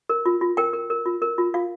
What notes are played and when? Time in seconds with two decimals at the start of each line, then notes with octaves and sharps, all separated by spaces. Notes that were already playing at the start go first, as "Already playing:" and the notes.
0.09 A#4
0.26 F4
0.41 F4
0.57 A#4 G5
0.73 A#4
0.90 A#4
1.06 F4
1.22 A#4
1.38 F4
1.54 F4 F5